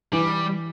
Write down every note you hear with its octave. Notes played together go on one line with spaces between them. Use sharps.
E3 G3